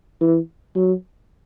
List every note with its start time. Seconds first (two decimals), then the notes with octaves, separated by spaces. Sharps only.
0.21 E3
0.76 F#3